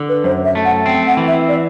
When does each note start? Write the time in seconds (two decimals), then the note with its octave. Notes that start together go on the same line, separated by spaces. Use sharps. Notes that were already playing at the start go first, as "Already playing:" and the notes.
Already playing: D3
0.09 B4
0.24 F#2 C5
0.45 E5
0.55 A3
0.65 F#5
0.86 C4 G5
1.07 F#5
1.17 E3
1.27 E5
1.49 D5